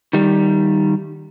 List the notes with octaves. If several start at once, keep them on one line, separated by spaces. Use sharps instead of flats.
D#3 G3